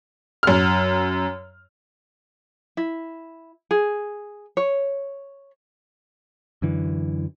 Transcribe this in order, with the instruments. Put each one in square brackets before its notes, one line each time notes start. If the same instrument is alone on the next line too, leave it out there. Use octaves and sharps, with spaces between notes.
[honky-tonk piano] F#2 F6
[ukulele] E4
G#4
C#5
[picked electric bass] F#2 D3 E3